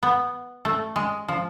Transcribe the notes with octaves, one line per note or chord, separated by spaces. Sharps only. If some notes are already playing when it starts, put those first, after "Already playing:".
B3
A3
G#3
F3